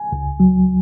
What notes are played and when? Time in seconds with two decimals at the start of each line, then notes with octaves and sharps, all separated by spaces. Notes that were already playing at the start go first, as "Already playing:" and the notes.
Already playing: G#5
0.12 C#2
0.40 F#3